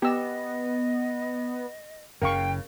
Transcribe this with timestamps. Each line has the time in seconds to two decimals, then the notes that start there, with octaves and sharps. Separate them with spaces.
0.02 B3 G4 D#5 E6
2.22 F#1 C#3 A#4 F5 G5 C#6